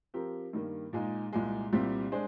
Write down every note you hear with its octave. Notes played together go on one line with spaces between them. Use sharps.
F3 C4 G4 A#4
G2 D#3 G3 A#3
A#2 G#3 D#4
C2 A#2 G#3
C2 A#2 G3 C4 G4
G#3 D4 G#4 C5